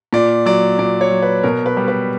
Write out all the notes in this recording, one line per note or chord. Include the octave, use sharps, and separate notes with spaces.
A#2 D5
F#3 D5
A#2 D5
C#5
F#3
B4
B2 A#4
B4
G3
B4